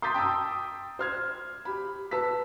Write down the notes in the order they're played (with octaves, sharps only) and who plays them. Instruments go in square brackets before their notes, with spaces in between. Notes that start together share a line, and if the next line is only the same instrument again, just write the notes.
[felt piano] C6 D6 D#6 G6 A6 B6
G5 A5 A#5 D#6 E6
C5 F6 G#6
G4 B5
B4 A5 E6 B6